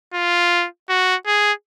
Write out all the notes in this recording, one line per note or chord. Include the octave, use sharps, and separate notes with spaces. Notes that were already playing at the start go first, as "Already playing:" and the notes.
F4
F#4
G#4